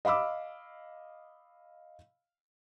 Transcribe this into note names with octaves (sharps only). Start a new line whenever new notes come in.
D#5 F5 B5 D6 E6